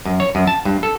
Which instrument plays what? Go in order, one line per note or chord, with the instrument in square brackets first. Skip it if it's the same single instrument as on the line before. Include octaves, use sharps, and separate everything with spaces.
[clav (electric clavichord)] F#2
C#5
F#2
A5
G2
A4